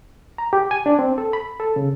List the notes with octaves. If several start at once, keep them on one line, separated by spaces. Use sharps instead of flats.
A#5
G4
G#5
D4
C4
A4
B5
A4
C#3